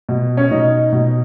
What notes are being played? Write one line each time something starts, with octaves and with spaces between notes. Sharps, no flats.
B2
C#4
B2 D#4
B2